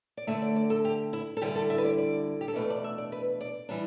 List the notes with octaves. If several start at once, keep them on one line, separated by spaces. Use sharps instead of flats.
D5
D2 D3 A3 E5
D5
D5
A4
G4
E4
A4
D3 G3 E4 G4
A4
E5
B4
D5
D5
G4
A4
E2 B2 A3 D4 B4
D5
E5
D5
B4
D5
E3 G3 D4